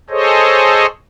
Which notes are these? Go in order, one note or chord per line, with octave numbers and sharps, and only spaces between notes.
G#4 A4 C5 C#5 D#5